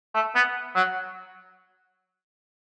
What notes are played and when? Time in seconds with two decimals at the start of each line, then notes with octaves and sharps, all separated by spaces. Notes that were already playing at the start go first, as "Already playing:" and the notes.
0.14 A3
0.35 B3
0.76 F#3